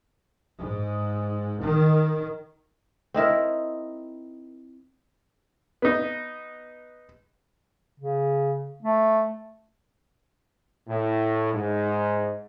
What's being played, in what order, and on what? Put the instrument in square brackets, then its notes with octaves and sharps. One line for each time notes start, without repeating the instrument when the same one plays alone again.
[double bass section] G#2
D#3
[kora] C4 D#4 E4 A#4
[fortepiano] B3 D#4
[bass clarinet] C#3
A3
[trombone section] A2
G#2